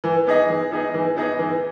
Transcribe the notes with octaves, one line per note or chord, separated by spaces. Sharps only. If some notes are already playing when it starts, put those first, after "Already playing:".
E3
B3 D#4 G#4 D#5
E3
B3 D#4 G#4 D#5
E3
B3 D#4 G#4 D#5
E3